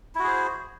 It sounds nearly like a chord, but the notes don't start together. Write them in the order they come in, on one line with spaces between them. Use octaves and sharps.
E4 F#4 G#4 C5